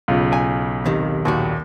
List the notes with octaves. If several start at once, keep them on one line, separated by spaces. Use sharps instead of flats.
B1 C#3 F4
G#5
D#2 C3 D#3
D#2 A#2 G3 F#4